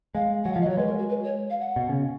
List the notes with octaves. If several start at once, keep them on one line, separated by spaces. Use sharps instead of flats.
G#3 F5
F#3 F#5
F3 F5
D#5
F#3 C#5
G#3 B4
A#4
F#4
B4
C#5
F5
F#5
B2
C#3